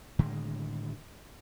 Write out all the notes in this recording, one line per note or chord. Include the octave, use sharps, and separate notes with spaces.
A2 D3 D#3 G#3